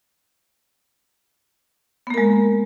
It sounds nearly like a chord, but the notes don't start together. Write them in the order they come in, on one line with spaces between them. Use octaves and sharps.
B3 A#3 A#4 G#3